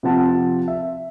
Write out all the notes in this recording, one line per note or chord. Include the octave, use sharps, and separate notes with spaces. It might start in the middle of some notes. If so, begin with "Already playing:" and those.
C3 F3 C4 F#5 A5
E5